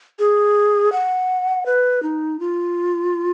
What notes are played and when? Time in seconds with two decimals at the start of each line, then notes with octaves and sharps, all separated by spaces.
0.19 G#4
0.92 F#5
1.66 B4
2.03 D#4
2.40 F4